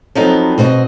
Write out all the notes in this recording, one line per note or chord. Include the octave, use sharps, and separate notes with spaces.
F3 F#3 B3 C4 D#4 A4
B2 C4 F#4 C5 D#5